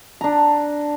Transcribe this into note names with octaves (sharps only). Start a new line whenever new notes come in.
D4 A#5